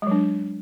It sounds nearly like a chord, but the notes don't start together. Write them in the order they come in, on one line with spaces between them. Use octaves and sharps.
G#3 F#3 D4